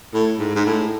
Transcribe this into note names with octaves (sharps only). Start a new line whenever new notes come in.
A2
G#2
G#2
A2